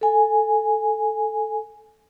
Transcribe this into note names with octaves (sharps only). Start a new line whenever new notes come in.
A4 G#5